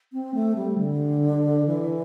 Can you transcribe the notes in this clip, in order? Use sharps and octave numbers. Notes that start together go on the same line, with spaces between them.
C4
A3
G3
D3
E3